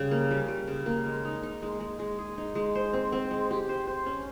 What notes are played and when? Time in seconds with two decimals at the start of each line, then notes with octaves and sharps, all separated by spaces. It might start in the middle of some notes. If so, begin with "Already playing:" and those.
Already playing: C#3 G3
0.11 A#3
0.31 G3
0.48 G3
0.67 C#3
0.86 A#3
1.06 G#3
1.25 D#4
1.43 D#4
1.62 G#3
1.80 G#3
1.99 G#3
2.19 G#4
2.38 D#4
2.55 G#3
2.75 C5
2.93 C4
3.12 C4
3.31 G#3
3.51 G4
3.69 C5
3.87 C5
4.06 C#4